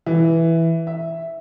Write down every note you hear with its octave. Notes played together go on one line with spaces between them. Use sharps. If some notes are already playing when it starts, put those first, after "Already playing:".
E3
E5